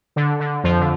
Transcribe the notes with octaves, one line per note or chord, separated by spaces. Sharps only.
D3
D3
F2 F3
D3